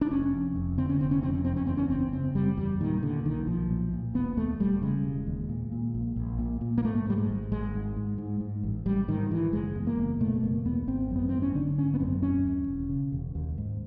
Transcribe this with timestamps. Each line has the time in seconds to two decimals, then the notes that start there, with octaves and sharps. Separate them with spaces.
0.01 D4
0.11 F1 C#4
0.34 F2
0.56 F1
0.78 D3 C4
0.90 C#4
1.00 F1 C4
1.11 C#4
1.22 F2 C4
1.34 C#4
1.45 F#1 C4
1.56 C#4
1.67 E2 C4
1.77 C#4
1.90 F#1 C4
2.13 C#3 C4
2.35 F#1 G3
2.57 E2 G3
2.80 A#2 D#3
3.03 A#2 D3
3.24 B1 D#3
3.47 B1 F3
3.70 A#2
3.93 A#2
4.14 E1 B3
4.37 D#2 A3
4.59 E1 G3
4.81 C#3 G#3
5.04 E1
5.27 D#2
5.49 A#2
5.72 A#2
5.95 A#1
6.16 A#1
6.39 A#2
6.61 A#2
6.78 A#3
6.85 G#2 A3
7.06 G#2 G3
7.18 G#3
7.29 G#1
7.52 G#1 G#3
7.74 G#2
7.97 G#2
8.18 G#2
8.41 G#2
8.63 A1
8.86 A1 G3
9.08 G#2 D#3
9.31 G#2 E3
9.53 F#1 G#3
9.75 E2
9.87 A#3
9.98 F#1
10.21 B2 A3
10.43 F#1 A#3
10.65 E2 B3
10.87 G#1 C4
11.11 F#2 B3
11.29 G#1 C4
11.42 C#4
11.55 D3 D4
11.78 G#1 C#4
11.94 B3
12.00 F#2 C4
12.22 E1 C#4
12.44 D#2
12.68 E1
12.89 C#3
13.12 E1
13.35 D#2
13.58 G#2